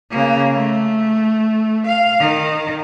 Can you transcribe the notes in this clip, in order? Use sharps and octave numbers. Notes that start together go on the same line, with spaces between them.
C#3 A#3
A3
F5
D#3